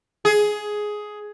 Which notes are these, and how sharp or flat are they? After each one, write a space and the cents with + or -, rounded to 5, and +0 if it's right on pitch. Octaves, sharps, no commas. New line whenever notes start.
G#4 +10